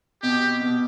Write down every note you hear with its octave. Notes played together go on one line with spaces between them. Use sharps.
B2 G4
B2